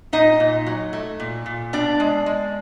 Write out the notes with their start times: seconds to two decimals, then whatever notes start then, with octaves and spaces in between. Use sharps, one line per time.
0.13 A#2 D#4 D#5
0.40 A#2
0.66 F#3
0.93 A3
1.20 A#2
1.46 A#2
1.73 B2 D4 D5
2.00 G#3
2.26 G#3